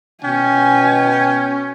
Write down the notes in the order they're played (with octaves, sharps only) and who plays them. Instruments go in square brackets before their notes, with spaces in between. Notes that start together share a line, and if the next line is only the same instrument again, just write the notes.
[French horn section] B2 [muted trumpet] C#4 [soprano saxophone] G5 [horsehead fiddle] G#5